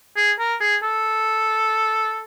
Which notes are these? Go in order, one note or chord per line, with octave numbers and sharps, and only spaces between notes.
G#4
A#4
G#4
A4